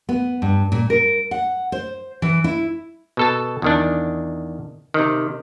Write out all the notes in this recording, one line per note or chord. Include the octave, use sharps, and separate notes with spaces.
B3
G2
A#2
A#4
F#5
C5
E3
E4
B2 A4 A5
E2 D#3 D4
C3 D#3